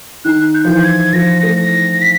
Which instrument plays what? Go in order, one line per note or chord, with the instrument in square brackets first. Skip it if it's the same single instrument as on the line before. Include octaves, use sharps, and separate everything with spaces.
[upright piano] D#3 [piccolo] F#6
[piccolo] G6
[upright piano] F3
E3
[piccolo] G#6
[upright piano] F3 [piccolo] A#6
[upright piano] A3
[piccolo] A#6
B6